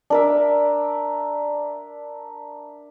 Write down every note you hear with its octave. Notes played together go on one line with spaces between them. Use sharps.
D4 A#4 E5